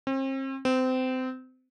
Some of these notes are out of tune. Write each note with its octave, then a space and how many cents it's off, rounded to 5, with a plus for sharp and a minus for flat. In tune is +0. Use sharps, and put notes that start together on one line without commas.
C4 +40
C4 -25